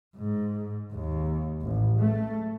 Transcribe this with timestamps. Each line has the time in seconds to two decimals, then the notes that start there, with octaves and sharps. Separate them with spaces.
0.16 G#2
0.93 D#2
1.62 A1
1.99 A3